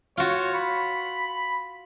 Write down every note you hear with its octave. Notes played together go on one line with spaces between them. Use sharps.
F4 F#4 C#5
B5